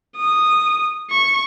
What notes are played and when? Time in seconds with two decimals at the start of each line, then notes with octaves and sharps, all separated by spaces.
0.17 D#6
1.10 C#6